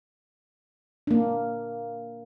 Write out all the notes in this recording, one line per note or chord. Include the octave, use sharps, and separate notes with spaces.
A#3 D4